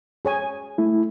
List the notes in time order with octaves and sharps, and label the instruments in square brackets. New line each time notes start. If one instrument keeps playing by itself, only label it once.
[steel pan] G#4 C#5 G#5
[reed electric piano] A3 E4